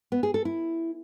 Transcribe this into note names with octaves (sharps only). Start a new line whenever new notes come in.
B3
G#4
A4
E4